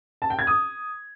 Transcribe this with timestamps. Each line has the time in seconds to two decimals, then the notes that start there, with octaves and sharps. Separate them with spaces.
0.22 A5
0.30 G5
0.39 G#6
0.47 D#6